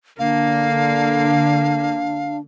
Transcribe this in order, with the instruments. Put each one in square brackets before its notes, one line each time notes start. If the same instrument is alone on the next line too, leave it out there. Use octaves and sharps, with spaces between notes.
[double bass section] D3 [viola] A#3 [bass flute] D4 [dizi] F5